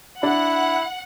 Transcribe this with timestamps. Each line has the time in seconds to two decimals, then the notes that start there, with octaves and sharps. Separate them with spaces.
0.23 D4 E4 F#5